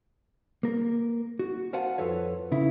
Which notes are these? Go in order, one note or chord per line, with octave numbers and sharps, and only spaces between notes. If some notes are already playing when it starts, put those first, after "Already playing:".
A#3 A#4
F#4
A#4 C5 F5 F#5 G#5 A5
F2 F4 A4 B4 C#5
C#3 E4